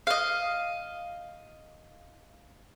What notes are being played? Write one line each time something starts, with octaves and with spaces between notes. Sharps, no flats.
D#5 F5